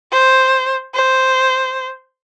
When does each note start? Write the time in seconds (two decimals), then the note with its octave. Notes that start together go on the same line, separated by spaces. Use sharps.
0.12 C5
0.94 C5